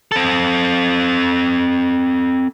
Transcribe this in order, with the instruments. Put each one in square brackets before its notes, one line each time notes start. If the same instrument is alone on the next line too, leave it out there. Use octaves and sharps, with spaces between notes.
[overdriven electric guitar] C4 A4